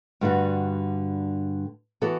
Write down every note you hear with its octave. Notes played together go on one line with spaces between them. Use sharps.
G2 D3 G3 D4 F#4
E3 B3 F#4 A4